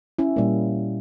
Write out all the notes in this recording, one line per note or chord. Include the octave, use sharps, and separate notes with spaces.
C#4 E4
A#2 G3 A#3